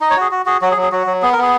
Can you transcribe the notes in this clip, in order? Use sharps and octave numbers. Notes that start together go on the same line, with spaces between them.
D#4 D#5
C#5
F#4 G#4
F#4
F#4 G#4
F#3 F#4
G#4
F#3
G#4
F#3 F#4
F#3
B3 G#4
A#4
B3 G#4